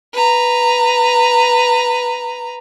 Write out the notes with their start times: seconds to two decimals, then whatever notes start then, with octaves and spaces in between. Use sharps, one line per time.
0.13 B4 A#5